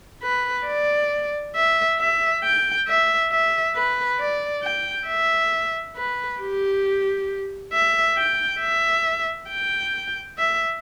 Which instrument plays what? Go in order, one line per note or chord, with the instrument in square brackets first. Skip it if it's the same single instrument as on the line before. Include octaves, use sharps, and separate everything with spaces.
[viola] B4
D5
E5
E5
G5
E5
E5
B4
D5
G5
E5
B4
G4
E5
G5
E5
G5
E5